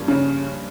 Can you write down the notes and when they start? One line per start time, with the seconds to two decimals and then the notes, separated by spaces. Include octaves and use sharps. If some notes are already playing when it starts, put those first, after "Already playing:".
Already playing: G2 F3 A#3 C#4
0.08 C#3